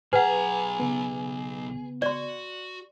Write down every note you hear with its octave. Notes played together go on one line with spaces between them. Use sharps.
B1 G#4 B4 F#5 A#5
C#3 B3
F#4 D5 C6